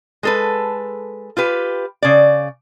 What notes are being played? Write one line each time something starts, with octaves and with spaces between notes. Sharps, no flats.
G#3 A4 B4
F4 G4 B4
C#3 D5